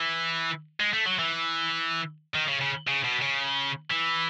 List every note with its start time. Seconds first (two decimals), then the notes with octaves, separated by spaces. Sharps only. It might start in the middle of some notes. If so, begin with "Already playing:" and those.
Already playing: E3
0.80 G#3
0.94 A3
1.06 F#3
1.19 E3
2.35 D#3
2.48 C#3
2.61 C#3
2.87 C#3
3.04 B2
3.22 C#3
3.90 E3